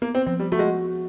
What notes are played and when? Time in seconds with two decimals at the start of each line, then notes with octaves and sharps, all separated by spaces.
0.02 A#3 B3
0.15 C4
0.26 F3 C4
0.39 G3
0.52 A3 F#4
0.59 G#3